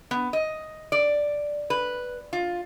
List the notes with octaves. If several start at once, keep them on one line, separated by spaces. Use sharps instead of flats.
B3
D#5
D5
B4
F4